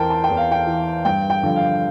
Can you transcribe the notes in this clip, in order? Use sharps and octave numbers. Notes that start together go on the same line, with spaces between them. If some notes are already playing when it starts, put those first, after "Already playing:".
Already playing: E2 E3 A#4 C5 G5 A5
A5
G5
E2
F5
G5
E3
G2 G5
G5
D3 F3
F5